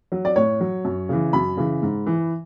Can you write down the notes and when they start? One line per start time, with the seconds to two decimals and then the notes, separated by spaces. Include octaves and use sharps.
0.12 F#3
0.25 D5
0.36 A2 C#5
0.60 F#3
0.85 F#2
1.09 C#3 E3
1.33 F#2 B5
1.57 C#3 E3
1.82 G#2
2.07 E3